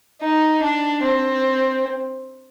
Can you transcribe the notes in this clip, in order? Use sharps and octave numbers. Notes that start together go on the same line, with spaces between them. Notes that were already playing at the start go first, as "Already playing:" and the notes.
D#4
D4
C4